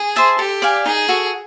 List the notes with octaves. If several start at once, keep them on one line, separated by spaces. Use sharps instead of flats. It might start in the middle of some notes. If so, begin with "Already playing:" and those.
Already playing: G#4
C5 E5 A5
G4 A4
D5 F5 G#5
D#4 G#4
F#4 A4